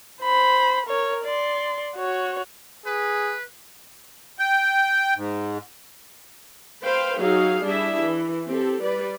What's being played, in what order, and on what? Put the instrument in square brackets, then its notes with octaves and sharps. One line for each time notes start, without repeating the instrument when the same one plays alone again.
[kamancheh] C5 B5
A#4 C#5
D5 C6
F#4 C#5
[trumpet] G#4 [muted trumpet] B4
[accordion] G5
G#2
[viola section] B4 C5 F5 G5
F#3 D#4 G#4 F5
G3 D4 E4 G#4 E5
E3
C4 G4 A4
G3 B4 D5